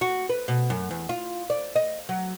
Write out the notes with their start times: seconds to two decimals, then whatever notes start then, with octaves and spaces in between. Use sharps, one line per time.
0.01 F#4
0.29 B4
0.48 B2
0.70 F#2
0.91 E2
1.09 F4
1.50 D5
1.76 D#5
2.09 F#3